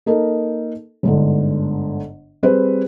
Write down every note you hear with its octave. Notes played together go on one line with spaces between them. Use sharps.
A#3 D#4 A4 A#4
G1 G#2 D3
G3 C4 G#4 B4 C5